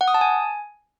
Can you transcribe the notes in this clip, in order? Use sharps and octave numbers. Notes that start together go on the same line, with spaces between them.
F#5
D#6
A5
G#5